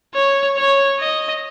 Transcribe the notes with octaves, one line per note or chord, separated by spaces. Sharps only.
C#5
C#5
D#5